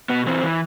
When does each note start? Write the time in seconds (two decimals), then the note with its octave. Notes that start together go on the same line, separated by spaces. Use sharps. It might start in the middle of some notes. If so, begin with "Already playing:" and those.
0.10 B2 B3
0.26 E3 C4
0.43 E3